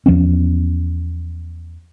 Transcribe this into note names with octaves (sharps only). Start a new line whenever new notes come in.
E2 F3 B3 C#4